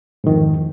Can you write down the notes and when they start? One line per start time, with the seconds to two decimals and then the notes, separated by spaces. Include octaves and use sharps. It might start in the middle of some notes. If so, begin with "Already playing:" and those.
0.24 G#2
0.27 D#3
0.29 F2